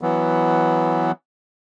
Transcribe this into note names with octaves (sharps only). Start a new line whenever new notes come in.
E3 F#3 B3